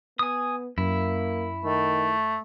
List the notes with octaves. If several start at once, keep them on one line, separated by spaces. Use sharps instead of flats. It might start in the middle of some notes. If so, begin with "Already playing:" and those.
B3 G#5 D#6
F#2 A#3 E4
D#3 A3